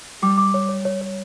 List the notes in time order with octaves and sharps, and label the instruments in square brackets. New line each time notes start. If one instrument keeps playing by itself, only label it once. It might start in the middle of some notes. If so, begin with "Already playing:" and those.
[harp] G3 [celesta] D6
[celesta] D6
C#5
C#5
C#5
C#5